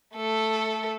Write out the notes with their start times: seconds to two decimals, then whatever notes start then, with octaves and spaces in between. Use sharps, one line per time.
0.15 A3 A4